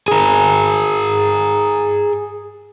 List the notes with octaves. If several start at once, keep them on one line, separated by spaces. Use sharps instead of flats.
G#4 A#4